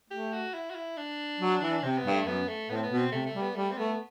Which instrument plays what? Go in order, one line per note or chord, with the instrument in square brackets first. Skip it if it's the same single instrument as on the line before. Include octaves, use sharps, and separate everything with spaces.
[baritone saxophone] A3 [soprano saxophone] G4
[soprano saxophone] F#4
E4
F#4
E4
D4
[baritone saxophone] F#3
E3
[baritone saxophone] C3 [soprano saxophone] C4
[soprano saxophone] B3
[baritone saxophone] G2
[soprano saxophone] A3
[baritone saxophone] F#2 [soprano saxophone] B3
[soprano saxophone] A3
[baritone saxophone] A2 [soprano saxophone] B3
[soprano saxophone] C4
B3
[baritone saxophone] B2
[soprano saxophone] C4
[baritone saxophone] C3 [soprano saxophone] A3
[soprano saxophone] A3
[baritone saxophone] G3
[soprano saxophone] B3
[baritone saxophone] G3 [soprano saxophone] A3
[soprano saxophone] C4
[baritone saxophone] A3 [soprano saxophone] B3